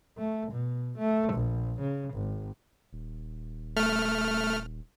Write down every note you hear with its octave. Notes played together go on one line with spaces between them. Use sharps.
A3
B2
A3
A#1
C#3
G#1
D#1
A3 F6